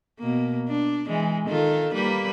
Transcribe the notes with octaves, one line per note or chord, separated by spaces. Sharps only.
B2 A#3
D4
E3 G#3
D#3 F4 A4
G3 A#3 B4